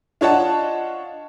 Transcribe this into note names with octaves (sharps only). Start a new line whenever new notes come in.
D4 F4 C#5 D#5 F#5 A5